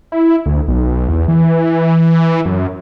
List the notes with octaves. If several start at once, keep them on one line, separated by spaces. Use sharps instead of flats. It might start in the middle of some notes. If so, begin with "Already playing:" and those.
E4
D2
B1
E2
E3
F#2